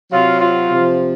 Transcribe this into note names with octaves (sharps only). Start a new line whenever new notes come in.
C3 F#3 F4
F4
C3 F3